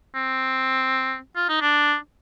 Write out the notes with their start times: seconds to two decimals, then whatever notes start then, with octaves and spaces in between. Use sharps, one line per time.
0.15 C4
1.36 F4
1.49 D#4
1.61 D4